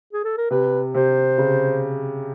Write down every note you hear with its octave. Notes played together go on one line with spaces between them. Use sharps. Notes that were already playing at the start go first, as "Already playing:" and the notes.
G#4
A4
A#4
C3 B4
C3 C5
C#3